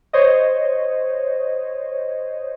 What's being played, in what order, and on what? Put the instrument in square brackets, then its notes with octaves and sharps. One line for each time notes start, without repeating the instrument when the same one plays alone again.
[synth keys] C5 C#5 D#5